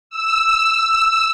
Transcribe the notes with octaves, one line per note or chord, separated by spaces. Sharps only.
E6